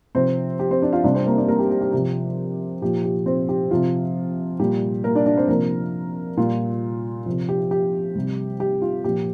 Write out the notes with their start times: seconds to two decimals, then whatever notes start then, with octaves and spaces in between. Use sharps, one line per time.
0.15 C3 F3 C4 C5
0.60 G4
0.71 C4 C5
0.82 D4 D5
0.93 F4 F5
1.04 C3 G3 D4 D5
1.15 C4 C5
1.26 A#3 A#4
1.37 D4 D5
1.48 A#3 A#4
1.59 G4
1.71 G4
1.81 G4
1.93 C3 F3 G4
2.82 A#2 F3 G4
3.04 G4
3.26 C4 C5
3.49 G4
3.71 C3 F3 F4
4.60 A#2 G3 G4
5.04 A#3 A#4
5.15 D4 D5
5.26 D4 D5
5.37 C4 C5
5.48 C3 F3 A#3 A#4
6.37 A#2 G3 F4
7.26 C3 F3
7.49 G4
7.71 G4
8.16 C3 G3
8.60 G4
8.82 F4
9.04 A#2 F3 G4